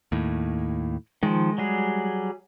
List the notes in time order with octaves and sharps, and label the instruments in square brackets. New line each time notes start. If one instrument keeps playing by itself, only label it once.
[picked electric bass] D#2 A2
[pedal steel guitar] D#3 F3 [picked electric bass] G#3
[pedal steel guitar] F#3 G3 G#4